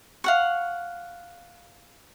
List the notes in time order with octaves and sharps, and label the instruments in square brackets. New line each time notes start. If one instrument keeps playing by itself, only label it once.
[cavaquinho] F5 F#5 C#6